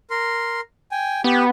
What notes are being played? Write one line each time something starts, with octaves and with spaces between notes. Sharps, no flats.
A#4 C6
G5 G#5
B3 G4